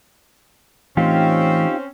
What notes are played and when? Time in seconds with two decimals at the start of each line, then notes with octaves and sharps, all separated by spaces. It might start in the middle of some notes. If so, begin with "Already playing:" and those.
0.97 E3 A3 C4 C#4 D#4 F4 G4